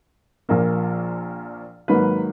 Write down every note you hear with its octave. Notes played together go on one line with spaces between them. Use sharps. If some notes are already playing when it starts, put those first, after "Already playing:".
A#1 A#2 A#3
G#2 D#3 F#3 A#3 D#4 B4